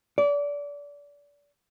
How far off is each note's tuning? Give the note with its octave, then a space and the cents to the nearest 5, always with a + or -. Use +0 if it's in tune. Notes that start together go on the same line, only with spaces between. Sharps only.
D5 -30